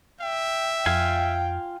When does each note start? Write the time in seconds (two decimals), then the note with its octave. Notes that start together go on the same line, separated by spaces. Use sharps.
0.21 E5 G5
0.86 F2 F4 F5 G5 G#5